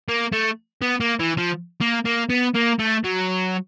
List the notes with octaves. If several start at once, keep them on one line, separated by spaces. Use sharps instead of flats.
A#3
A3
B3
A#3
E3
F3
A#3
A#3
B3
A#3
A3
F#3